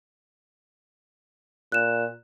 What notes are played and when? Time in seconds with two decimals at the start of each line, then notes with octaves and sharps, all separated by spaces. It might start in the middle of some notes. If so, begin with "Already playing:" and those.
1.72 A#2 F#6 E7